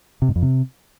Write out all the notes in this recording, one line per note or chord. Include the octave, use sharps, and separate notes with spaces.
C3
G#2
F2
C3